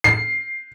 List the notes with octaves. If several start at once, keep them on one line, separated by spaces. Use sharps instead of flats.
C7